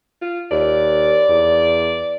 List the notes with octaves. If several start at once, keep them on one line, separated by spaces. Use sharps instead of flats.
F4
D#2 D5
E2